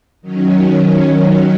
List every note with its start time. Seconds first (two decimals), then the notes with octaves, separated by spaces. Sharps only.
0.21 D#3 F#3 C#4